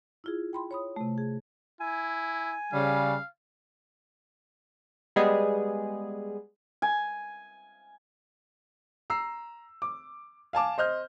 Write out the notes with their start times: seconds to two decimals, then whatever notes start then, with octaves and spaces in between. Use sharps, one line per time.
0.24 E4 F4 G#4
0.53 G5 B5 C6
0.71 C#5 B5 D#6
0.96 C3 A3
1.18 G#4
1.80 E4 G#5
2.73 C#3 G3 F5
5.16 G3 G#3 B3 G#4
6.82 G#5
9.10 A#5 E6 C7
9.82 D6
10.53 F5 G#5 A5 D6
10.78 C5 D#5 F6 G6